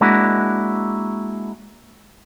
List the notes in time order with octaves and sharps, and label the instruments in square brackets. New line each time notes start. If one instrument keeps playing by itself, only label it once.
[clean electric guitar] G#3 A#3 D4 E4 F#4